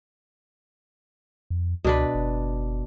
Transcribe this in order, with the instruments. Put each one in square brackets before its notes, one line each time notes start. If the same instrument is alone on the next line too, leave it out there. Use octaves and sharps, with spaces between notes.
[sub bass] F2
[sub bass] C#2 [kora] B2 D4 B4
[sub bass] F#1